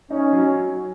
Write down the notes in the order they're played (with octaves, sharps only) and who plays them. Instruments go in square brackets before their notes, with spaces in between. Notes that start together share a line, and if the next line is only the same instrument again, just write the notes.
[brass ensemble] C#4 [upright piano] D#4
[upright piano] F#3